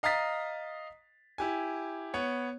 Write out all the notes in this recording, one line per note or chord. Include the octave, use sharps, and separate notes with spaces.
D#5 F5 A#5 D#6 A6 B6
E4 G4 G#5
B3 C#5